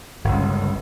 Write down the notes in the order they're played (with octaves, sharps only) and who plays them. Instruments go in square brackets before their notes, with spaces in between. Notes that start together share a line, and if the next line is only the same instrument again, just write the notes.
[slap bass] G1 C#2